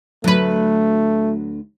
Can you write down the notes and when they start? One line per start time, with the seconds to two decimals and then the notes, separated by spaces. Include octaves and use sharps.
0.24 D2 F#3 A3 B4